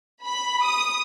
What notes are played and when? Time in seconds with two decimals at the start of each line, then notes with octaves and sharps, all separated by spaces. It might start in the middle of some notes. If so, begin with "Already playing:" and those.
0.24 B5
0.64 D#6